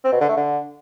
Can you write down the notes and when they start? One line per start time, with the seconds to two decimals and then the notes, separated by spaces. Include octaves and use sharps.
0.04 C4
0.12 B2
0.20 D3
0.29 A3
0.37 D3